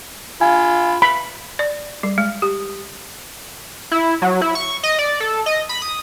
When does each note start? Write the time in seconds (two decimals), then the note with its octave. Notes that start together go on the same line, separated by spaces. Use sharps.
0.41 F4 G#5 B5
1.02 B5
1.59 D5
2.03 G3
2.18 G#3
2.42 G4
3.91 E4
4.22 F#3
4.41 E4
4.55 C#6
4.83 D#5
4.99 D5
5.20 A4
5.46 D#5
5.69 B5
5.82 D#6